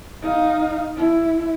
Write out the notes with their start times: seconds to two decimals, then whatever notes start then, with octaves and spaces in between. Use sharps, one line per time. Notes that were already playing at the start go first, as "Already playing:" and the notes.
0.22 D#4 F5
0.96 E4